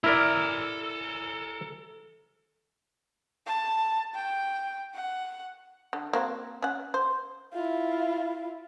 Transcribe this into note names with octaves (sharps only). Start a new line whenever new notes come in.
E4 A4 A#4 D5 A#5
A5
G5
F#5
D3
A#3 C4 F#4
C#4 F#5
C5
E4 F4